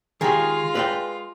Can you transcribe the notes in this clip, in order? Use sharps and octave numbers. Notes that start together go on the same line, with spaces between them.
D#3 G#3 F4 G4 G#4 F5
B4 D5 G5